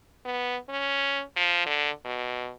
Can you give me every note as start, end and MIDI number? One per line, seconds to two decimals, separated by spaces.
0.25 0.57 59
0.69 1.22 61
1.36 1.62 53
1.66 1.90 50
2.05 2.51 47